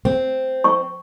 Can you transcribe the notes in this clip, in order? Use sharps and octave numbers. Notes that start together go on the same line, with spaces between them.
C4
C#6